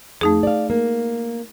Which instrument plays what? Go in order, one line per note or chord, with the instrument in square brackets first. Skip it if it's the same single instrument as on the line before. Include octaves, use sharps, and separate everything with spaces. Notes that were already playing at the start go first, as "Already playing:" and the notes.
[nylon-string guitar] F2 [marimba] A3 D#4 G#4
[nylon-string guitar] D5 F5
A#3